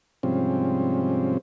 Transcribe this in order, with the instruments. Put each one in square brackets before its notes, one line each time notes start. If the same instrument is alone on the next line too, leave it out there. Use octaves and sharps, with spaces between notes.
[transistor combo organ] G#2 C3 F3 G3 C4 C#4